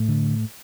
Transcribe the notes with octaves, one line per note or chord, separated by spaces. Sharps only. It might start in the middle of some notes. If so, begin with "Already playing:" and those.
Already playing: A2 A3
D3